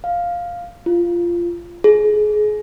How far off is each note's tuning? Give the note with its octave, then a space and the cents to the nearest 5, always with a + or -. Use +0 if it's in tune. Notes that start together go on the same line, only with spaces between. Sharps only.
F5 +5
F4 -15
G#4 +30